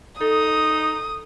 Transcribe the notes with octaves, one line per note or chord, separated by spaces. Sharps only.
D#4 A4 D#6